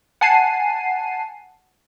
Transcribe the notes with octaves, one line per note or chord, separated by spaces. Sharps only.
F#5 G#5 A5 C7 D#7